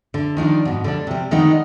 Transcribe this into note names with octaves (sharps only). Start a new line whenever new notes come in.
D3
D#3 F3 D4 D#4
G#2 B2
D3 G3 D4
C3 G3
D3 D#3 G#3 B3 D#4